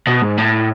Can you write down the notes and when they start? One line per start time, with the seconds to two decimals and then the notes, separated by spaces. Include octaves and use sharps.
0.07 B2
0.22 G#2
0.37 A2